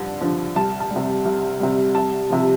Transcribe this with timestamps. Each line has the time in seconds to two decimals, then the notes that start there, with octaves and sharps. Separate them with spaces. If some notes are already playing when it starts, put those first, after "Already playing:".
Already playing: G2 D3 F3
0.21 D3 F3
0.56 C2 A5
0.80 A5
0.91 G3
0.96 C3
1.26 C2
1.60 C3 G3
1.95 C2 A5
2.30 C3 F3